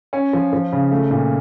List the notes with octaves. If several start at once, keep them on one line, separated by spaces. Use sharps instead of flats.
C#4
F3
F3
C#3
A3
A#2